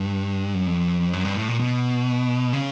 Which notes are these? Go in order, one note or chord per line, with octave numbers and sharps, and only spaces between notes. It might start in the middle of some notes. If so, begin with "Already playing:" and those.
Already playing: G2
F#2
F2
F#2
G2
A2
A#2
B2
C#3